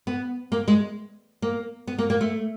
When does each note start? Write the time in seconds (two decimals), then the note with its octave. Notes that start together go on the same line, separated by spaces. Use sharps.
0.07 B3
0.52 A#3
0.68 G#3
1.42 A#3
1.87 B3
1.98 A#3
2.10 A#3
2.21 A3